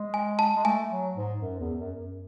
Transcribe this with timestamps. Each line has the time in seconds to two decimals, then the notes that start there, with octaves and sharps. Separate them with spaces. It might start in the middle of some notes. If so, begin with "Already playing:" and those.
Already playing: G#3
0.14 G#5
0.39 A5
0.56 G#3
0.64 A3 G#5
0.90 F#3
1.15 G#2
1.41 F#2
1.60 E2
1.79 F#2
1.97 F#2